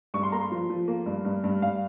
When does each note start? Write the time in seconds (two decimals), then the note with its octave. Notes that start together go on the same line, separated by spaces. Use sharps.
0.14 G2 C#6
0.23 C6
0.32 A#3 A#5
0.41 C6
0.52 F3
0.70 F3
0.88 A#3
1.06 G2
1.25 G2
1.44 G2
1.62 G2 F5